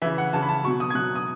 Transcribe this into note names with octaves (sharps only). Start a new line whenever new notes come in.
C#3 E3 E5
F#5
C#3 E3 A5
B5
A5
B2 F#3 C#6
D#6
G#6
B2 F#3 F#6
D#6